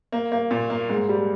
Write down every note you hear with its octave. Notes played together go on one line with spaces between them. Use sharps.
A#3
A#3
A#2
A#3
G#2
G3